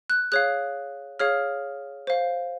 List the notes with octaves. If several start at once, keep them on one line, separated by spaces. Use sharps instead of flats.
F#6
G#4 C#5 F5 F#6
G#4 C#5 F5 F6
C5 F5